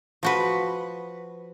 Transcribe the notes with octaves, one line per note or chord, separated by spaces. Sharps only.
F3 F#4 B4